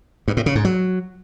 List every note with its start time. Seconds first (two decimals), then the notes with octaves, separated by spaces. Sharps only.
0.28 G2
0.37 A2
0.46 C#3
0.55 G#2
0.65 F#3